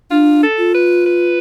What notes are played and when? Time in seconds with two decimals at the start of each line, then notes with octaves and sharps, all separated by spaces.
0.11 D4 F4
0.43 A4
0.58 F4
0.74 B4
1.06 B4